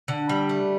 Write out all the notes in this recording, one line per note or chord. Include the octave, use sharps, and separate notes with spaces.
D3
G3
A3